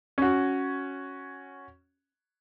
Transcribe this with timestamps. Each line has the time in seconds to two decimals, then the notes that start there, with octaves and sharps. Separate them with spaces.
0.18 C#4 F#4